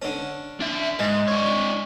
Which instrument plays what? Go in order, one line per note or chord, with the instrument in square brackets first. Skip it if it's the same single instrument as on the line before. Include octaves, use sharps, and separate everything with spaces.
[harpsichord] D3 C#4
[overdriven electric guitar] D4 E5
[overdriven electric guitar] G#2 [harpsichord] G#3
[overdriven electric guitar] D4 C#5